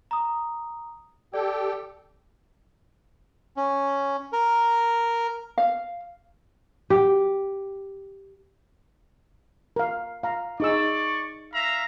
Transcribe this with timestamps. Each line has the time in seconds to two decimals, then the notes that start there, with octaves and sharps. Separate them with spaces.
0.11 A#5 D#6
1.34 G4 A4 D5 G5
3.57 C#4
4.33 A#4
5.58 F5
6.90 G4
9.76 A#4 F5
10.23 F5 A#5
10.60 D#4 G#4 D5 C#6 E6
11.54 E5 F5 A#5